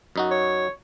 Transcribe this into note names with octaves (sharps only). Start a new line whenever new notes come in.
F#2 D#4 F#4
C#5